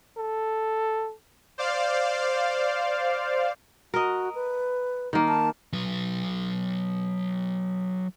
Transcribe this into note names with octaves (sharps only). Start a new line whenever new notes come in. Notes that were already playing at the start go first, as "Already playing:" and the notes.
A4
C5 D5 F5
F#4 A#4 D#5
B4
D#3 A#3
A5
F#3 B4